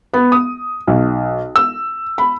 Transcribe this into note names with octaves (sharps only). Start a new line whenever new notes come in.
B3
D#6
B1
E6
B5